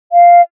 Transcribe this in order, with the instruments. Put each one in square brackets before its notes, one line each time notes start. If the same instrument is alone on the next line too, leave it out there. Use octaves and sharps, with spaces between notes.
[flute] F5